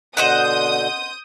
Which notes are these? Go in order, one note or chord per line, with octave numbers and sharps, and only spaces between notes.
B2 D3 C5 D#5 F#5 D#6 G6